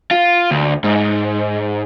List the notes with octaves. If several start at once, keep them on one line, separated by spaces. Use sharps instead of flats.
F4
D2
G#2